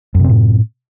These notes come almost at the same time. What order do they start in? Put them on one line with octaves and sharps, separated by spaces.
F#2 C3 C4 A2